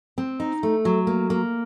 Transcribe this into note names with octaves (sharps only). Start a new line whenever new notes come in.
C4
D#4
A3
F#3
A#3
A#3